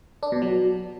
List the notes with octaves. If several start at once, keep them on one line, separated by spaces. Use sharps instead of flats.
D4
B2
F#3